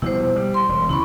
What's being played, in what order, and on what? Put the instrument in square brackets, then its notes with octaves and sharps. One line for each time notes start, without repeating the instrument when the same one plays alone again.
[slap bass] B2 F3 G3 [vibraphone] E4 C5
[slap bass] G3
[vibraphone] C6
[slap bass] E1
[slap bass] D2 C#3 [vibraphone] E4 B5 C#6